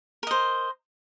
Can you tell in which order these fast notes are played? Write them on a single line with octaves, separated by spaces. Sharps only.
A#4 D#5 C5